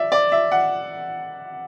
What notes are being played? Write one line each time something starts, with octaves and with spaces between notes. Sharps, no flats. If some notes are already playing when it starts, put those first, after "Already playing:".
Already playing: D5 E5
D5
E5
F#5